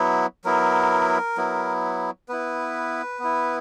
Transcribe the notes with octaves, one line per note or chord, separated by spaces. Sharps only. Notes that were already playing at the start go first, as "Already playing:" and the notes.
Already playing: F#3 B3 E4
F#3 B3 E4 A#4
F#3 B3 E4
B3 E4 B4
B3 E4